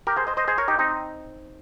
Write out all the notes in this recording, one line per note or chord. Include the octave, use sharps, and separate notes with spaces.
G4 A#4
G#4 C5
C5 D#5
C5 D#5
G#4 C5
A#4 C#5
D#4 G4
C4 D#4